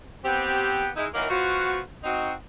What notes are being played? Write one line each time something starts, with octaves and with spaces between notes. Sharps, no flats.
B3 C4 G4
G#3 D#4 E4
D#3 E3 F#3 A#3 D#4 A#4
F3 B3 F4 F#4
C4 D#4 F#4